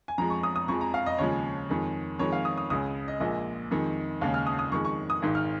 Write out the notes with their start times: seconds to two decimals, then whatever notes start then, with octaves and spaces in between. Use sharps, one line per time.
0.08 G#5
0.18 F2 F3 G#3 A#5
0.30 C#6
0.43 D#6
0.56 D#6
0.68 F2 F3 G#3 C#6
0.81 A#5
0.94 F5
1.06 D#5
1.19 D#2 C#3 F3 G#3 C#5
1.69 F2 D#3 G#3
2.19 F2 D#3 G#3 C#5
2.32 F5
2.45 D#6
2.57 D#6
2.70 C#2 C#3 G#3 D#6
3.08 D#5
3.20 A#1 A#2 G#3 D#5
3.71 F2 D#3 G#3
4.21 D#2 C#3 G#3 F5
4.34 F6
4.47 D#6
4.59 D#6
4.72 F2 D#3 G#3 C#6
4.85 C#6
5.10 D#6
5.22 G#1 G#2 D#3
5.35 F6